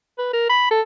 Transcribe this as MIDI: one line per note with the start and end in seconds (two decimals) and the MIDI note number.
0.18 0.29 71
0.33 0.45 70
0.49 0.67 83
0.71 0.81 69